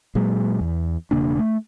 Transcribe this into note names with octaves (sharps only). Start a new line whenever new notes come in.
A#2 F#3 G#3
E2
E1 C#3 A#3 D4
A3